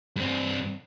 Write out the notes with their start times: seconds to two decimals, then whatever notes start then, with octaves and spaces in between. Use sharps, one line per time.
0.16 G2 C4